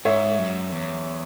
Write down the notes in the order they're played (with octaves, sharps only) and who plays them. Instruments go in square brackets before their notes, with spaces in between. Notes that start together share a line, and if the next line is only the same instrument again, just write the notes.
[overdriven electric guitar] G#2 [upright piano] C#5 E5
[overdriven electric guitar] F#2
E2